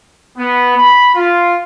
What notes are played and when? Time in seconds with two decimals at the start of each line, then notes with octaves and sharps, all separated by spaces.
0.38 B3
0.77 B5
1.15 F4